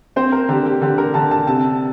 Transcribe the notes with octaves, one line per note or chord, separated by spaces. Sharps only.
C4 C5
A#4
D3 G4
G4
D3 G4
A#4
D3 A5
A5
C3 A5